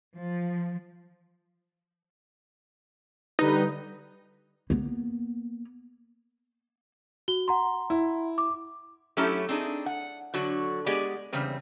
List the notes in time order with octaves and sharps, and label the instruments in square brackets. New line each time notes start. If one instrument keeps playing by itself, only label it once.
[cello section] F3
[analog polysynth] D3 G3 B4 [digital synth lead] D#4
[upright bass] A#3 B3
[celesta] F#4 G7
F#5 A#5 C6
[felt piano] E4
[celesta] D6
[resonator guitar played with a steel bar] F#3 A3 C#4 E4 G4 A4
C4 D4 D#4 G#4
F#5
D3 F#3 F#4 D5
G#3 B3 G4 G#4 D5
E2 C#3 G3 C4